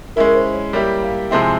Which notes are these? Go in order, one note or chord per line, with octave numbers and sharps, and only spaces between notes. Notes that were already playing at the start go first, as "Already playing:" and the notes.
G#3 C#4 E4 A#4
A#4
C5
C#5
G3 A#3 E4 G4 C#5
F5
C3 F3 G#3 C4 E4 G5
G#5